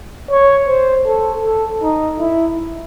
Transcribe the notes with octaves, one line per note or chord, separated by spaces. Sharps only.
C#5
C5
A4
A4
D#4
E4